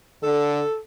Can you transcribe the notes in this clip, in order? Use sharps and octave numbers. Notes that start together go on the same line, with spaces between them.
D3 A4